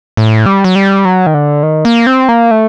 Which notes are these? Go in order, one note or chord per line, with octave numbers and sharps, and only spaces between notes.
A2
G3
F#3
G3
F#3
D#3
D3
D#3
A#3
C4
A#3
A3